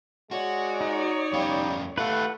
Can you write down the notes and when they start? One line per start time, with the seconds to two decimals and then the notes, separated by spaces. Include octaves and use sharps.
0.31 G#3 F#4 C#5 D5
0.81 D#4
1.33 F2 G3 C#4 F5
1.98 A3 E4 G4 B4 F5 F#5